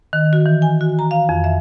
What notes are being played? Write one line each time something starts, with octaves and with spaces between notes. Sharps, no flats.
D#3
F#4
E3
G#5
F#4
A#5
F5
F2
E5